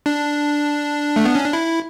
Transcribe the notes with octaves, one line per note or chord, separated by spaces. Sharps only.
D4
A3
B3
C#4
D4
E4